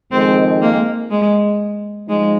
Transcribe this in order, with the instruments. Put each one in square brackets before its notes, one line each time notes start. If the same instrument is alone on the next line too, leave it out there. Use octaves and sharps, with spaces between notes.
[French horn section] F2 D#3 G#3 [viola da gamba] C4
[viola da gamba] A#3
G#3
[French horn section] F3 D#4 [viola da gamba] G#3